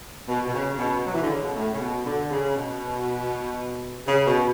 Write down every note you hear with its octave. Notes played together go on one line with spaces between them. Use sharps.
B2
B2
C#3
C#3
B2
F#3
E3
D3
C#3
B2
A2
C#3
B2
D3
C#3
B2
C#3
B2